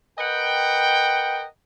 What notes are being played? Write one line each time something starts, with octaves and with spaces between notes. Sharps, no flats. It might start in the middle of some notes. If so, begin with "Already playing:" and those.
A#4 B4 D#5 F#5 G5